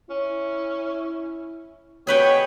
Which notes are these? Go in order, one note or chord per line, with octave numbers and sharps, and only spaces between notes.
C#4 E4
B2 G4 G#4 B4 C#5 G5